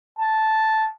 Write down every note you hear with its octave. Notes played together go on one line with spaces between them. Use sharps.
A5